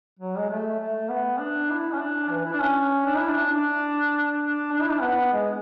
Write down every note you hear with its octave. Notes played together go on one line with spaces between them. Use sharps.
F#3
G#3
A3
A3
B3
D4
E4
C#4
D4
E3
E4
D4
C#4
D4
E4
D4
D4
D4
D4
E4
D4
B3
G#3